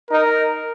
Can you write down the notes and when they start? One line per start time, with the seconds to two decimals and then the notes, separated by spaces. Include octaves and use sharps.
0.11 D#4 A#4